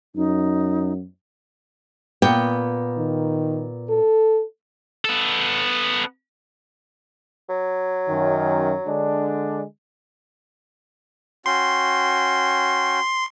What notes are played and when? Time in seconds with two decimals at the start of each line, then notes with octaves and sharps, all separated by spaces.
0.15 F#2 D#4
2.22 A#2 B3 G5
2.97 D#3
3.90 A4
5.05 B3 A4
7.50 F#3
8.09 F#2 D#3
8.86 D3 G#3 D4
11.46 C#4 F#4 G5 C6